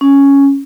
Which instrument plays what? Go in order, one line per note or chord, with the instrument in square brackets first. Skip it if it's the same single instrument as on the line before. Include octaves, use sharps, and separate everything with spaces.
[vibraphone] C#4